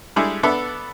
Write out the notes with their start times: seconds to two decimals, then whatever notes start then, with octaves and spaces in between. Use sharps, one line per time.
0.16 G3 G#3 D4 E4 G#4 A4
0.43 B3 D4 A4 E5